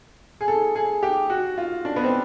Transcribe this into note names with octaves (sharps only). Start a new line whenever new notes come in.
G#4
A4
G#4
G4
F#4
F4
D4
B3
C4